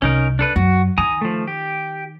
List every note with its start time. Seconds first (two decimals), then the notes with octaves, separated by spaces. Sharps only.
0.02 C2 C#4 D#4 A#4
0.39 D4 A4 B4
0.56 F#2 F#4
0.98 D#3 G#5 A#5 D#6
1.21 F3 A3
1.47 G4